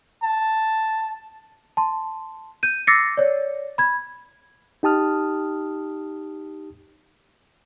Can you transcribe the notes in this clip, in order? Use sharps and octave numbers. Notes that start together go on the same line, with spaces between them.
A5
A5 C6
G6 D#7
D6 E6 A6 A#6 C7 C#7
C#5 D5
B5 G#6
D#4 G4 A5 D#6 F6